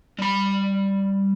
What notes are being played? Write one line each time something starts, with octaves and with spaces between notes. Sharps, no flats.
G3 B5